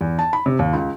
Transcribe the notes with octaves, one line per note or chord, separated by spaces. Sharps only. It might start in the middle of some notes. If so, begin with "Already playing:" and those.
E2
A5
B5
C3
D#2
C#2